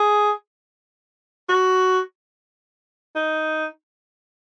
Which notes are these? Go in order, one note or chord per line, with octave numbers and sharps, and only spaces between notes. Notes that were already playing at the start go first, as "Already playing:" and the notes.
Already playing: G#4
F#4
D#4